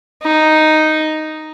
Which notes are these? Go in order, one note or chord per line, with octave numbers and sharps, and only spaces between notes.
D#4